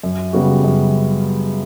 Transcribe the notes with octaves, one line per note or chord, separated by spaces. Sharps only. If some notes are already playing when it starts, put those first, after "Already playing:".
F#2
C#3 G3 B3 F#4
F#2